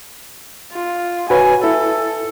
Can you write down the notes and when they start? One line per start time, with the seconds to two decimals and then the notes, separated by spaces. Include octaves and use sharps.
0.73 F4
1.30 F#4 B4 C#5 G#5
1.64 E4 A4